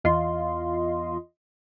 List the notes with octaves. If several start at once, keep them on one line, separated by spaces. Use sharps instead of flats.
E2 F4 D#5 C6